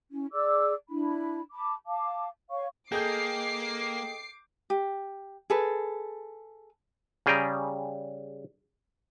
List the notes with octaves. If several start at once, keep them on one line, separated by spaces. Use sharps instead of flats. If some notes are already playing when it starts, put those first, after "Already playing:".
C#4 E4
G#4 D5 D6 E6
D4 E4 B5
A5 B5 D6
F5 A5 D6
C#5 F5 C#6
A#3 G#4 A4 D#5 G5 D6 G6 C7
G4
G#4 A4 B4
C#3 G3 G#4 G5 A#5